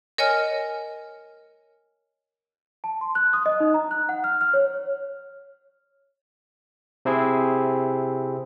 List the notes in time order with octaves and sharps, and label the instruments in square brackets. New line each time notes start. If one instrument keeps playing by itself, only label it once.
[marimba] A#4 C#5 D#5 G#5 F6
[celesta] A5
C6
F#6
D#6
D#5
D#4
A#5
F#6
F#5
F6
F6
C#5
[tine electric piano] C3 C4 E4 G#4